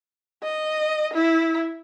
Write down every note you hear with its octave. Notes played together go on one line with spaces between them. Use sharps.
D#5
E4